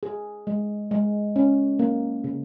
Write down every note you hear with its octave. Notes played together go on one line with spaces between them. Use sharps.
G#4
G#3
G#3
C#4
A#3
C#3